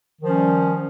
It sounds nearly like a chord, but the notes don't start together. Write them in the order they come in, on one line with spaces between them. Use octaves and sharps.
D#3 F3 C#4 G3